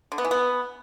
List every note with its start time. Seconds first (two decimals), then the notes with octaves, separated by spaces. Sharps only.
0.12 D3
0.18 B3
0.25 E3
0.31 B3